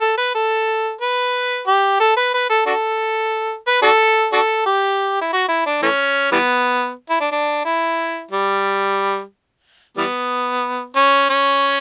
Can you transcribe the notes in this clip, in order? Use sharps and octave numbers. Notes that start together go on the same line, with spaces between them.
A4
B4
A4
B4
G4
A4
B4
B4
A4
D4 F#4 A4
B4
D4 F#4 A4
D4 F#4 A4
G4
E4
F#4
E4
D4
E3 A3 C#4
E3 G3 B3
E4
D4
D4
E4
G3
E3 G3 B3
C#4
C#4